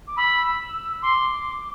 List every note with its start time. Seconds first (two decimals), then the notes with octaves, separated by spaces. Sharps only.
0.07 D6
0.17 B5 E6
1.02 C6 D6